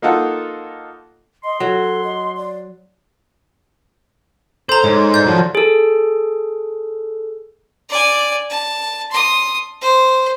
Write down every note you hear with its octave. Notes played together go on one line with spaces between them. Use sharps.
A#3 D#4 F4 A4 F#5
D#5 C6
F#3 A4
D#5
D5
A4 C5 A#5
G#2 C#5
D5 G6
F3 F#3
G#4 A4
D5 G#5
A5
C6 D#6
C5